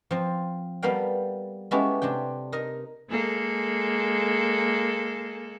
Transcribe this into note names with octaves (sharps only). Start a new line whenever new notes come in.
F3 C4
G3 B3 A4 A#4 F5 G5
G#3 A3 B3 C#4 E4 G4
C3 D4 G4 G5
D#4 A#4 D#5
G#3 A#3 A4